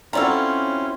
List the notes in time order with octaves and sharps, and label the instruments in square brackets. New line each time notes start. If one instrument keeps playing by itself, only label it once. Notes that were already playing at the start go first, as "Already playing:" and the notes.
[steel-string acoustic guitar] F#3 C4 E4 [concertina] C#4 F4 [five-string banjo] A4 D5 A#5